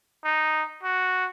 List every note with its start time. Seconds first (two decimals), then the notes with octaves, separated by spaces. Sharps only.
0.24 D#4
0.83 F#4